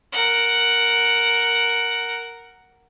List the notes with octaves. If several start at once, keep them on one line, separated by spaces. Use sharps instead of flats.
A#4 F#5